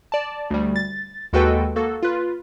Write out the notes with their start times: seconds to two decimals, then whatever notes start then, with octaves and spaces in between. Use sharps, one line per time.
0.12 D5 A5
0.50 D2 G3
0.76 A6
1.33 D#2 G#3 F#4 A4 B4 G5
1.76 A#3 F#4 A4
2.03 F4 B4